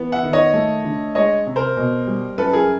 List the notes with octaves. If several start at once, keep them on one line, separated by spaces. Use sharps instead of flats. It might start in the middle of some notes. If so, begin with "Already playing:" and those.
Already playing: E3 B3
E5 F#5
D#3
C#5 D#5
A3
D3
G#3 C#5 D#5
C3
A#4 C5
B2
G3
F#2 A4 B4
G#4 A#4